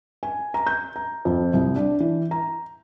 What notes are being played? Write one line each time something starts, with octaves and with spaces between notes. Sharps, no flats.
G#5
A#5
G6
A#5
F2
C2
D4
E3
A#5